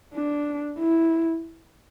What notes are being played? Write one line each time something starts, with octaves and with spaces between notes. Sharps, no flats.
D4
E4